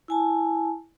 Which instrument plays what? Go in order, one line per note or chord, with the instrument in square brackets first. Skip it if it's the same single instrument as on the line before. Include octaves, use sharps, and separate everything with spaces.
[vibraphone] E4 G#5 A5